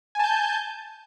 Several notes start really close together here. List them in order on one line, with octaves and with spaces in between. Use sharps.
G#5 A5 G6